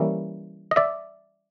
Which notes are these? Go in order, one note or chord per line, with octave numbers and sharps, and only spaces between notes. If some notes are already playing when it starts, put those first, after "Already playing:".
Already playing: E3 G3 A#3 C#4 E4
D#5
D5 E5